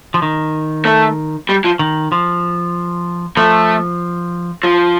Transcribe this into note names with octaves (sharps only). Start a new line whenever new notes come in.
F3
D#3
A3
G3
F3
D#3
F3
F3 A3
F3